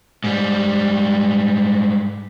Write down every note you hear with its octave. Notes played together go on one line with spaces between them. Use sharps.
G#2 G3